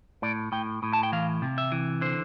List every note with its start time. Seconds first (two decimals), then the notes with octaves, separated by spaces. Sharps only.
0.22 A2 D5
0.52 A2 G5
0.83 A2
0.93 A5
1.03 G5
1.12 E3 F5
1.42 C3
1.58 E5
1.72 E3
2.01 D3 C5